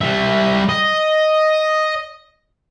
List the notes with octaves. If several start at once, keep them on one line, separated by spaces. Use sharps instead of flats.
G3 E5
D#5